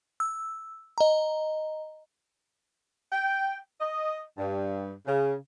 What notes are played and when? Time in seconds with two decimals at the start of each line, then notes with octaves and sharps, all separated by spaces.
0.20 E6
0.98 D#5 A#5
3.12 G5
3.81 D#5
4.38 G2
5.06 C#3